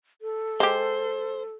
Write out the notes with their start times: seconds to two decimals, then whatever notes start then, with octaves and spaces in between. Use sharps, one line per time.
0.22 A4
0.60 G#3 G4 C5